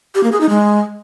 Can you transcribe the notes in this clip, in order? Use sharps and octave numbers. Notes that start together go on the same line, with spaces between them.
G4
A#3
G#4
D#4
G#3